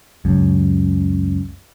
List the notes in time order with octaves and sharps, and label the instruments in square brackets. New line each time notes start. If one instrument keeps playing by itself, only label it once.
[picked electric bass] C#2 F#2